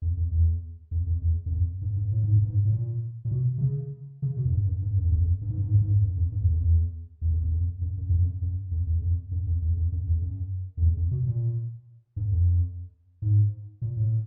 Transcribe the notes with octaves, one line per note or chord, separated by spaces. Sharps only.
F2
F2
E2
F2
F2
E2
F#2
F2
G2
G2
A2
G#2
G2
G#2
A2
A#2
A#2
B2
C3
C#3
C#3
B2
F#2
G2
F#2
G2
F#2
F2
E2
F2
G2
G#2
G2
G#2
G2
G#2
G2
F#2
F2
G2
E2
F2
E2
E2
F2
E2
F2
F#2
F#2
F2
F#2
F#2
F2
E2
F2
F#2
F2
E2
F2
F#2
E2
F#2
F2
E2
F2
B2
A#2
G2
F2
G#2
A#2
A2